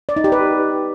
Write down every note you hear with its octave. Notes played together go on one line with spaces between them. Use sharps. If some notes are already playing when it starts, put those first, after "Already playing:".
D5
D#4
G4
B4